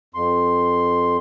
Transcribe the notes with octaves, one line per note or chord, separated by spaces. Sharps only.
F2 C6